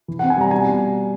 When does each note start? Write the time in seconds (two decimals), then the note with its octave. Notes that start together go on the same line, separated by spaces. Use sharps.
0.08 E3
0.19 C4 F#5
0.30 G#5
0.38 G3 A#5
0.51 B2 G#5